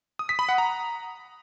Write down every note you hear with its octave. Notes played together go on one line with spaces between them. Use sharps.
D#6
B6
B5
F#5
A#5